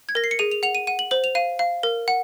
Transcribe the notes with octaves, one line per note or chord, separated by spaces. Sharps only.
G#6
A#4 A#6
C7
C#7
G#4 D#7
F7
F#5 F7
D#7
F#5 D#7
F#7
C5 F#7
F7
F5 D#7
F5
A#4
F#5